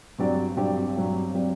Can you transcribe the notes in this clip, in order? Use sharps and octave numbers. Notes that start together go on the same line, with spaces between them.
G2 F#3 C4 G4 D5
G2 F#3 C4 G4 D5
G2 F#3 C4 G4 D5
F#3 C4 G4 D5